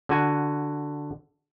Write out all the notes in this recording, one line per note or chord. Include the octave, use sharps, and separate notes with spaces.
D3 F#4 G#5